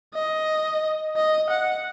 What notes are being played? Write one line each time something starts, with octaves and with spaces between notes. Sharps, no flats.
D#5
D#5
F#5